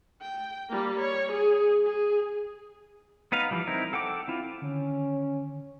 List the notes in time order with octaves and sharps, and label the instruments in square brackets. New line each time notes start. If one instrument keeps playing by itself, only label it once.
[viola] G5
G3 A#3
C#5
G#4
G#4
[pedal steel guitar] B3 D#4 B4 F5
E3 F3 G3
C4 D#4 E4 A#4
A4 F#5 G5 D6
C4 E4 F4
[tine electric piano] D3 D#3 [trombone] C#4